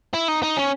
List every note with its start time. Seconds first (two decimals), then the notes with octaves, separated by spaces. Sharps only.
0.14 E4
0.28 D#4
0.43 D#4
0.57 C#4